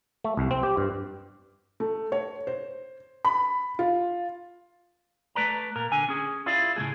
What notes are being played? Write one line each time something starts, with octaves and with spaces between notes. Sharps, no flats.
A3
C2
C4
G4
G2
A3
C#5
C5
B5
F4
A3 B4 D5 A#5
A#2 A#4
D3 G#5
C#4 G#4
E4 F4 G#4 D5 F5
A2 C#3 A3 G#4